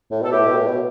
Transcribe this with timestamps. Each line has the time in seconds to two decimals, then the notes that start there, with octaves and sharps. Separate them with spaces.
0.11 A2
0.22 B2 A4
0.31 A2 E4 G4
0.46 B2
0.57 A2
0.68 B2